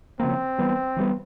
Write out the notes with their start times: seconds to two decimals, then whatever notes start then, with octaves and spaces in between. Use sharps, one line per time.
0.20 C#3 F3 A#3 C4
0.58 E3 G3 B3
0.96 E3 G3 B3